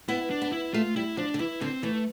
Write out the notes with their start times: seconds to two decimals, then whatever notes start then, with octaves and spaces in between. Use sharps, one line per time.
0.08 B3 E4
0.30 D4
0.42 B3
0.52 E4
0.74 A3 F4
0.96 G3 E4
1.17 F3 D4
1.34 D3
1.39 E3 E4
1.61 D3 C4
1.83 E3 A3